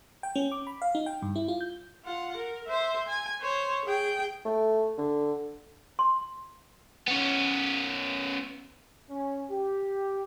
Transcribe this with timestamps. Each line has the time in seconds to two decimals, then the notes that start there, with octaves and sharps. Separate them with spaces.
0.23 G5
0.35 C#4
0.52 D6
0.67 B5
0.82 F5
0.95 D#4
1.06 G5
1.22 G2
1.36 E4
1.48 F4
1.61 G6
2.05 F4 F#5
2.37 A#4
2.67 C5 E5
3.08 G#5
3.41 C5 C#5
3.85 G#4 G5
4.45 A3
4.98 D3
5.99 C6
7.08 B3 C#4
9.08 C#4
9.49 G4